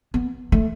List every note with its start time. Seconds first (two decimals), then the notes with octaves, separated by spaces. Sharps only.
0.14 B3
0.52 A3